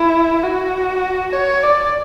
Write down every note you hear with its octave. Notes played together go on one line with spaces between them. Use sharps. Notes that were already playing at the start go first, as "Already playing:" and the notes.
Already playing: E4
F#4
C#5
D5